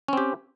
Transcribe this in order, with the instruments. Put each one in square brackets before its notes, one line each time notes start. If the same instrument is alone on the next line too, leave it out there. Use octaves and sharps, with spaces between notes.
[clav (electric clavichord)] C#4
C4
G4